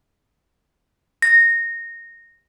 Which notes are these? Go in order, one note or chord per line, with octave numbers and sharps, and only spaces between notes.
A#6